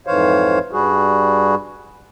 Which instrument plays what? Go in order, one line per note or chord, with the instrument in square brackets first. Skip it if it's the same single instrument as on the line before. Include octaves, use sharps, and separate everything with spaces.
[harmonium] F2 G#2 E3 C5 C#5 F5
G2 G3 F#4 G#4